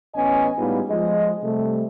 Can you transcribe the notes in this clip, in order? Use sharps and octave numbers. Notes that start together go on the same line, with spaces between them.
A1 B3 C#4 D#5 G#5
A2 G3 G#3 B3 D#4 F4
F3 G#3 D#5
C3 G3 A3